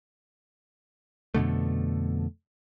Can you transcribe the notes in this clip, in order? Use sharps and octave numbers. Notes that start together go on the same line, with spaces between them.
F2 B2 D3 A3